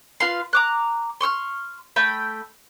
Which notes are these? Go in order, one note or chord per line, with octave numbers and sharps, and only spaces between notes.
F4 B4 F5 C6
A#5 D6 F#6
C6 C#6 E6 F6
A3 G5 B5